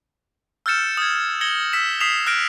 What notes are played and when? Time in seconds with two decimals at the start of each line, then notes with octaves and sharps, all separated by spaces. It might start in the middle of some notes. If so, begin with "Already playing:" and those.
0.66 E6 F6 G6 A6 C#7 E7
0.97 D#6 G#6
1.41 G#6 A#6 C#7 F#7 G7
1.73 E6 B6 E7
2.00 D#6 B6 C7 E7 F7
2.27 F6 F#6 A#6 D7